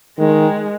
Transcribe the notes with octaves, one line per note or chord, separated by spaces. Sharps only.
D#3 G#3